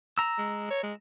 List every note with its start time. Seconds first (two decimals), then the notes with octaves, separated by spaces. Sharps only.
0.18 A#5 E6
0.38 G#3
0.70 C#5
0.83 G#3